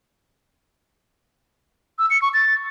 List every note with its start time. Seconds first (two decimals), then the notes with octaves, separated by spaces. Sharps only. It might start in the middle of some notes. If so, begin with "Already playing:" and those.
1.99 E6
2.10 C#7
2.22 C#6
2.34 A6